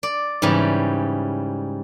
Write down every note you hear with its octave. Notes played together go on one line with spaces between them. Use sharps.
D5
G#2 C#3 E3 G3